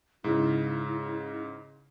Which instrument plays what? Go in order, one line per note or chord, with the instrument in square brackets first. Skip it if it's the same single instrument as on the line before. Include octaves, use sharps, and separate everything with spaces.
[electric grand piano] G#2 C#3 [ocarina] E4